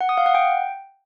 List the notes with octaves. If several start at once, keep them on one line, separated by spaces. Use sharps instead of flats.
F#5
D#6
F5
F#5
G5